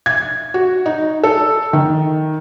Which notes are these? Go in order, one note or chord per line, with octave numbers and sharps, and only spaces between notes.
G#6
F#4
D#4
A4
D#3